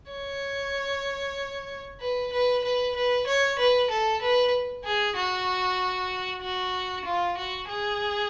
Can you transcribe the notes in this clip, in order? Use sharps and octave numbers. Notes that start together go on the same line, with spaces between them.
C#5
B4
B4
B4
B4
C#5
B4
A4
B4
G#4
F#4
F#4
F4
F#4
G#4